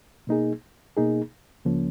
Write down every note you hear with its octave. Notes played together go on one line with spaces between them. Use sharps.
B2 A#3 D#4 G#4
B2 A#3 D#4 G#4
C#2 C#3 F3 A#3 C#4